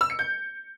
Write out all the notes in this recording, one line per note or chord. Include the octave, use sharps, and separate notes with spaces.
E6
C#7
G6